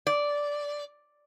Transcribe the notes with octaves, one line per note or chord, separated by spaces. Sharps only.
D5